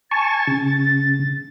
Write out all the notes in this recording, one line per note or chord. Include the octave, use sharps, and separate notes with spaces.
G#5 A5 C#6 A6
C#3